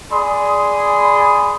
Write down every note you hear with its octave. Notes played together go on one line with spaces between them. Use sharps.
G#4 D5 G#5 B5 C6 D#6